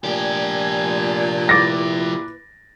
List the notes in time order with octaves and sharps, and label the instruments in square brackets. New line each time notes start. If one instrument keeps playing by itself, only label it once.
[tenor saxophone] A#2 [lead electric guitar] F3 G4 [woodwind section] D4 G#5
[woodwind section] E4 B4 [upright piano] D6 A6 A#6